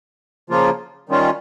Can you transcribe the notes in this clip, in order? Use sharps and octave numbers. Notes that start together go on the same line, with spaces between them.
C#3 F3 A#3 F4
D#3 G3 C#4 F4